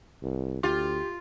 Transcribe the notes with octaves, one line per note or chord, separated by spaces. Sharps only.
C2
D2 F4 G4